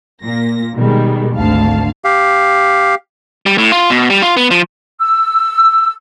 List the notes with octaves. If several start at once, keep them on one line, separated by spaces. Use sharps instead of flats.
A#2 A#3 A#6
B2 D#3 G3 G#3
G#1 D2 F5 A5
G4 F5
G3
A2
F4
B2
G3
F4
B3
F3
E6